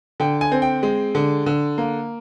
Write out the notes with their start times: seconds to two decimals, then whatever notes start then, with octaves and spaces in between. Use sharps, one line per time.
0.20 D3 G5
0.41 G#5
0.52 C4
0.62 G5
0.83 G#3
1.15 D3
1.46 D3
1.78 A#3